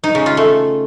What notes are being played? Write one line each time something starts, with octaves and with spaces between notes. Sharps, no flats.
D#4
C#3
F4
A3